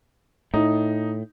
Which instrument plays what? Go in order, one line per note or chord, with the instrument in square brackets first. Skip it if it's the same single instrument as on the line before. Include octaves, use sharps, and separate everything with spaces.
[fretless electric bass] A2 [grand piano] D#4